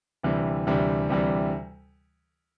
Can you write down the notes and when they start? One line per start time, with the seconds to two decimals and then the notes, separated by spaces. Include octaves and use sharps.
0.23 D2 C3 E3 G3
0.67 D2 C3 E3 G3
1.09 D2 C3 E3 G3